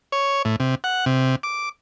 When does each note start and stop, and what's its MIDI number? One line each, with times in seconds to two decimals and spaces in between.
0.12 0.42 73
0.45 0.56 45
0.60 0.75 48
0.84 1.05 78
1.06 1.36 48
1.43 1.69 86